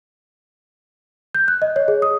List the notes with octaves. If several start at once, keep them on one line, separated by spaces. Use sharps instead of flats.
G6
F#6
D#5
C#5
G#4
D#6